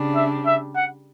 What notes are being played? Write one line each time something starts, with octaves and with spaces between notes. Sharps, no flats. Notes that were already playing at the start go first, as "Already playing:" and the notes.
Already playing: C#3 G3 D4
E5
E5
F#5